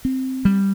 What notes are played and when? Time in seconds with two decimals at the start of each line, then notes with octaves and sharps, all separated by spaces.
0.05 C4
0.45 G3